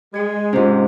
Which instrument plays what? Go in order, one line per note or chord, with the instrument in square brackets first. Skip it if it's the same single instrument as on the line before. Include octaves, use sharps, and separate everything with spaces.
[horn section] G#3 [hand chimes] G#6
[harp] G#2 C3 [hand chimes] C#4 F4